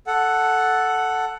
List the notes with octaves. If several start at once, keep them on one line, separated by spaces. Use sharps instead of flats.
A4 F#5